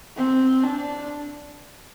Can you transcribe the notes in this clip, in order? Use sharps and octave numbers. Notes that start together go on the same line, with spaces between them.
C4
D4